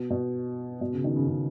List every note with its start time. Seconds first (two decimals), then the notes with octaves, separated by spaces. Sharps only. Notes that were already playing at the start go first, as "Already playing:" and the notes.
Already playing: B2
0.10 B2
0.81 B2
0.93 C#3
1.04 D#3
1.16 C#3
1.27 C#3